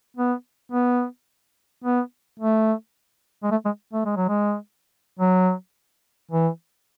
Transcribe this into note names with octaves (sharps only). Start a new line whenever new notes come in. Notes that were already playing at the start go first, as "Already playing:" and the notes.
B3
B3
B3
A3
G#3
A3
G#3
A3
G#3
F#3
G#3
F#3
E3